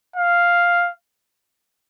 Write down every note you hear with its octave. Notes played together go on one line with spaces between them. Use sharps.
F5